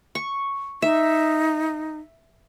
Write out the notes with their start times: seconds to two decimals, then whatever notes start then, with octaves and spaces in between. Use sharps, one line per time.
0.15 C#6
0.82 D#4 E5